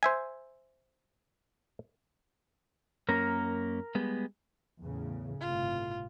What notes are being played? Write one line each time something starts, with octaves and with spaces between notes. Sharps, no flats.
C5 E5 G#5
F#2 A#3 C#4 A#4 A#5
G3 G#3 B3
E2 A2 C#3
G1 A2 C3 F4